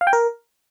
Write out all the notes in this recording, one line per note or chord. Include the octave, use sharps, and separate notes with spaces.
F5
G5
A#4